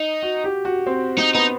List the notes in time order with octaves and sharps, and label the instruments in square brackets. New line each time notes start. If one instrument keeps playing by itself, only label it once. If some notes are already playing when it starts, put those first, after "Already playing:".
Already playing: [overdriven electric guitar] D#4
[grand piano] F#4
G4
F#4
C4
[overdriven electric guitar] D#4
[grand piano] B3 [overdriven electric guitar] D#4